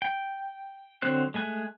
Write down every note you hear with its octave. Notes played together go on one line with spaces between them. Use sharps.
G5
D3 F#3 C4 C5 F#6
G#3 A3 G#5 F#6